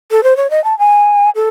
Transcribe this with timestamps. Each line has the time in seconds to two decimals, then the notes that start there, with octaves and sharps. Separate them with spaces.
0.11 A4
0.23 C5
0.37 C#5
0.50 D#5
0.64 A5
0.79 G#5
1.35 A4